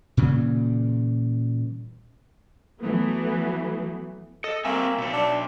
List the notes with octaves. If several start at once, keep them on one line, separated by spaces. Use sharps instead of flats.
A#2 C#3 E3 G3
E3 F#3 A3 B3
A4 D#5
G3 A#3 C4 E5 G#5
B2 C#5
D4